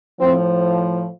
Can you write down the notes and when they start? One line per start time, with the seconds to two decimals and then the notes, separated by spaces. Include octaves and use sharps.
0.19 A2 F3 C4